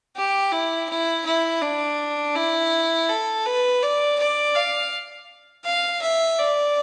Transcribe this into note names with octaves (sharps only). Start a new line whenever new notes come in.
G4
E4
E4
E4
D4
E4
A4
B4
D5
D5
F5
F5
E5
D5